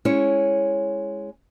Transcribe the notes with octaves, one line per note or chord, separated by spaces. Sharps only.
G#3 C#4 E4 C#5